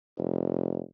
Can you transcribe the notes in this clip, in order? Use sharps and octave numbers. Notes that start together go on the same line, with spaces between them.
F1